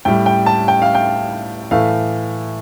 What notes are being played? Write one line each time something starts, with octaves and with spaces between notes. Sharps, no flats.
A2 G3 G5
G5
A5
G5
F5
G5
A2 E3 A3 F5